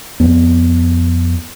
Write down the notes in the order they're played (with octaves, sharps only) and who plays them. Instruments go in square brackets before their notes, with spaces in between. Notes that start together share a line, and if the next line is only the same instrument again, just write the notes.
[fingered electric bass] F2 B3